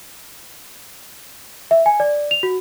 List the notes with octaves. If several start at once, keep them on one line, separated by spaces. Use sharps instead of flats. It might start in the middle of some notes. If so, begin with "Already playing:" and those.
E5
G#5
D5
F7
F#4